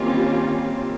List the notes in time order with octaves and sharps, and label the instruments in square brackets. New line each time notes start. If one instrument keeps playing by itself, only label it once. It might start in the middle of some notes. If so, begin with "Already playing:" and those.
Already playing: [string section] D#3 G3 C#4 F4 [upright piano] A#3 C4